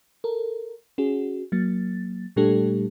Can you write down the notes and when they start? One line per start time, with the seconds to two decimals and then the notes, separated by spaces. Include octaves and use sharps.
0.24 A4 A#4
0.98 C#4 F#4 G#4
1.52 F#3 A#3 A6
2.36 A#2 G3 A3 D4 G4 A4